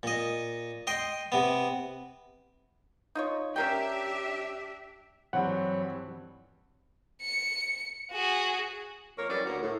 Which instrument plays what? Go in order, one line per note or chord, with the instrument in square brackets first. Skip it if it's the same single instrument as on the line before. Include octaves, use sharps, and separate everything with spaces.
[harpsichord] A#2 D#5
D#5 G5 C6
C3 B3
[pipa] D#4 F4 C#5
[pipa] C#4 A#4 G5 [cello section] D4 G4 E5
[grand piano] G2 E3 C4 [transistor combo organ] F#3 C#5 B5 [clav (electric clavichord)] F#5
[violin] C#7
F#4 G#4
[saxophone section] F2 A#3 A#4 C#5
E3 F#3 G3 C#4 D5
D2 A#3 B3 F#4 A#4
A2